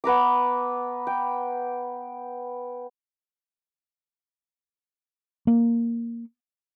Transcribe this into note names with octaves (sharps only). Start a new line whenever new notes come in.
B3 B4 A#5 D6
G5
A#3